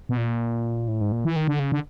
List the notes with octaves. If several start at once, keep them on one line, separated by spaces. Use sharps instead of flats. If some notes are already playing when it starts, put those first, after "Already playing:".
B2
A#2
A2
G#2
A#2
E3
D#3
D3
C#3
D3